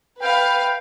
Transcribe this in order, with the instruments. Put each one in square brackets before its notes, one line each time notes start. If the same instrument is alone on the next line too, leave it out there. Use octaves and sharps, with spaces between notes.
[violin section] B4 F5 [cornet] G5